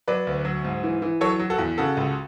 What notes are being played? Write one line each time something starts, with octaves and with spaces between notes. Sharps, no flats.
F#3 B4 D5
D2
F#3
G#2
E3
E3
F#3 A4 C#5
F#3
F#4 A4
E2
C#3 F#4 A4
C#2